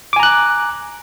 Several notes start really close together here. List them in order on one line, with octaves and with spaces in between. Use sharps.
D6 G#5 A#5 F#6